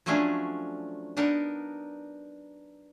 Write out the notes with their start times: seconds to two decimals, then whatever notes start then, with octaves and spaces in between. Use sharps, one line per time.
0.06 F3 F#3 A3 C#4 D4 G#4
1.17 B3 D4 D#4 A#4